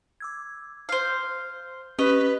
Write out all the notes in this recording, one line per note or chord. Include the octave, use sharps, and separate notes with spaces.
D6 E6 G#6
C5 F5
C#4 G4 B4 D#5 C#6